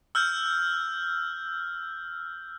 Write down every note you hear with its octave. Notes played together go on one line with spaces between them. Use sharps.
E6 F6 G6